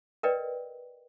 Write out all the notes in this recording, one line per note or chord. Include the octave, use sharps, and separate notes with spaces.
A#4 B4 D5 D#5 G5